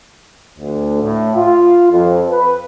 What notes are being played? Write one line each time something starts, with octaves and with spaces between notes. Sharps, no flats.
D2
A2
F4
F2
B4